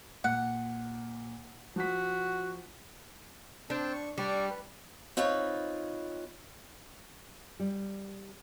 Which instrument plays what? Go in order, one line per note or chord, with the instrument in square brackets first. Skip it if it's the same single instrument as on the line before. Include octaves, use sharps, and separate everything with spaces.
[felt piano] A#2 [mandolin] F#5
[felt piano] F3 B6 [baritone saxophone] F#4
[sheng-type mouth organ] C4 G5 A5 [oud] D4
[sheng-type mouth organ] C#6
[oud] G3 [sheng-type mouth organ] D4 D5 C#6
[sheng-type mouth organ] B4
[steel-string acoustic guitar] C4 D#4 F4 B4 C#5
[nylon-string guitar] G3